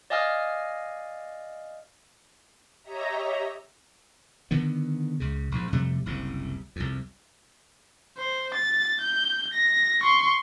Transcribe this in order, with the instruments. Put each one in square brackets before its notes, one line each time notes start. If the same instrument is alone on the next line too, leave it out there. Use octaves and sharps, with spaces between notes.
[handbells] D5 D#5 F5 G#5 D#6 F6
[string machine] G4 C#5 D#5 E5 A#5
[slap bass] D3 D#3 B3
C#2 C#3
A#1 G#2
F2 C3 G3 A3
F#1 C2 C3
C2 F2
[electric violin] C5
A6
G6
A#6
C6 C#6